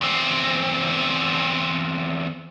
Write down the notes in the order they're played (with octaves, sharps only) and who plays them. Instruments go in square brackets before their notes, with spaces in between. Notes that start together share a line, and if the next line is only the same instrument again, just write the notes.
[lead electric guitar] E2 C4